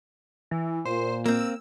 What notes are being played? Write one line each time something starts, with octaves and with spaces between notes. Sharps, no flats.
E3
A#2 C5
A#3 C4 E6